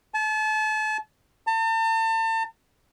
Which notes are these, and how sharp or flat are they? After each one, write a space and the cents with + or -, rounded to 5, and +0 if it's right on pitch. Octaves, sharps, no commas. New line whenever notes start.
A5 -35
A5 +40